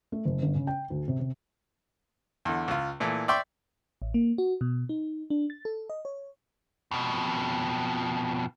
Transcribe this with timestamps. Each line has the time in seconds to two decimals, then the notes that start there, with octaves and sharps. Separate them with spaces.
0.12 A3
0.25 F#1
0.42 G1
0.55 C#3
0.67 G5
0.90 D2
1.08 C3
1.20 C3
2.45 E2 D3
2.68 C#2 F4
3.00 A#2 E3 A3
3.28 D5 E5 G5 C6 C#6
4.02 A1
4.14 A#3
4.38 F#4
4.61 B2
4.89 D#4
5.30 D4
5.50 A6
5.65 A4
5.90 D#5
6.05 C#5
6.91 F2 B2